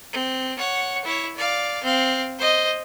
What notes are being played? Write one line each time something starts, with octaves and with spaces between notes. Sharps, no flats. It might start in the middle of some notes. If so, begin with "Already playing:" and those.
C4
C#5 F#5
E4 C#5
D5 F5
C4 F5
C5 D#5